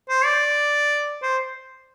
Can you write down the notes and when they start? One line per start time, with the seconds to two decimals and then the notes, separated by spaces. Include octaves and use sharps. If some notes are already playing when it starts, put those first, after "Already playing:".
0.09 C5
0.25 D5
1.22 C5